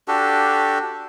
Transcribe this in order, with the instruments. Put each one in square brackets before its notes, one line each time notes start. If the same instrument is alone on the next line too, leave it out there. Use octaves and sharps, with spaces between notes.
[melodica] D4 F#4 G4 A4